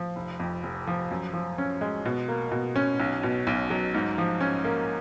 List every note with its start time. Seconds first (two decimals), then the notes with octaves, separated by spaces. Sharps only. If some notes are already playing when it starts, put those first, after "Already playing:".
Already playing: F3
0.16 F1
0.40 F2
0.63 F1
0.87 F3
1.11 F#2
1.33 F3
1.58 C#4
1.81 G#3
2.06 B2
2.28 A#3
2.52 B2
2.76 C#4
3.00 B1
3.23 B2
3.47 B1
3.70 F#3
3.94 G#2
4.18 F3
4.41 C#4
4.64 A#3